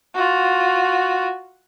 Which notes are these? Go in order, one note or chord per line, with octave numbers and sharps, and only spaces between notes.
F4 F#4